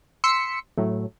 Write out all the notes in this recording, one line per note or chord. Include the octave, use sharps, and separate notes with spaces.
C6 E6 B6 C#7
A2 F#3 A3